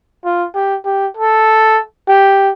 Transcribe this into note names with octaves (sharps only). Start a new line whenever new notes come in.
F4
G4
G4
A4
G4